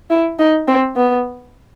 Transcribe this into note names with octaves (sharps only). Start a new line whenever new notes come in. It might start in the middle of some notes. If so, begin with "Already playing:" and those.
E4
D#4
C4
B3